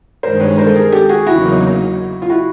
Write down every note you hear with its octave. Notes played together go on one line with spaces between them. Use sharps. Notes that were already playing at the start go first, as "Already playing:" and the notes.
G2 D#3 G#3 A#4 C5
B4 C#5
A#4 C5
A4
G#4 A#4
G4 A4
F#4 G#4
E2 C#3 F#3 A#3 D#4 E4 F#4
F4
E4 F#4